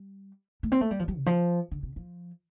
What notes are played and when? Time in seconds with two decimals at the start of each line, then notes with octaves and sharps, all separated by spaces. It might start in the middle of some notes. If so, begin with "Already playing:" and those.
Already playing: G3
0.63 A3
0.72 C4
0.81 A3
0.91 G3
0.99 F3
1.08 G3
1.17 C3
1.26 F3
1.71 D3
1.83 C3
1.96 F3